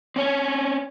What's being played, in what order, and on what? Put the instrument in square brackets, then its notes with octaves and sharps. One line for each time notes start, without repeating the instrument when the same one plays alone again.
[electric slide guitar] C4 C#4 C#5